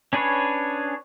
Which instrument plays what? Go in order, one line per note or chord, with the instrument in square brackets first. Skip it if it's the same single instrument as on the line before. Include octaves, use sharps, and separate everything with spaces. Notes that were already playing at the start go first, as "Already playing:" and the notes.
[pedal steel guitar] C#4 D4 G#4 B4 C#5